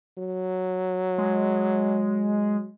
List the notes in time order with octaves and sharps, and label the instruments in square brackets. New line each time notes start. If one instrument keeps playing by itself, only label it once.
[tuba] F#3
[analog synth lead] G#3